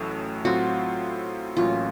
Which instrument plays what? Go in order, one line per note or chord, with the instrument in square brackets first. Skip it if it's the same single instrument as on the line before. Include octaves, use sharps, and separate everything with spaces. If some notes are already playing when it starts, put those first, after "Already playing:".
Already playing: [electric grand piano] A1 A2 F#3 A3 C#4
[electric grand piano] A2 F#3 C4 F4 [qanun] F#4
[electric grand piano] A1 A2 F#3 A#3 C#4 [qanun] F4